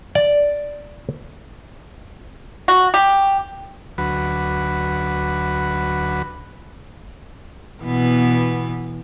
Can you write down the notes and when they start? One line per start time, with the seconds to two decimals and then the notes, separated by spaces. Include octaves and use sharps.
0.15 D5
2.68 F#4
2.94 G4
3.98 D2 F#3 F#4 B4 B5
7.83 B2 E3 B3